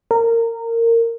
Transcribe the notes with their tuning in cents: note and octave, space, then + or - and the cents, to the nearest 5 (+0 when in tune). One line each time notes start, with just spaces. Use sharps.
A#4 -20